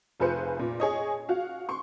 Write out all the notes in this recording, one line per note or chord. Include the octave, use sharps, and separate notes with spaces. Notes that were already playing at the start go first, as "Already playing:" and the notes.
F1 F4 G#4 B4 C5 C#7
A#2
G#4 C#5 D#5
F#4 F5
C6 C#6